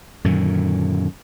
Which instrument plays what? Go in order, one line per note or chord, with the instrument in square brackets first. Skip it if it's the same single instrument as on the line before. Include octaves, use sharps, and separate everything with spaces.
[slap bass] F#2 A#2 D3 D#3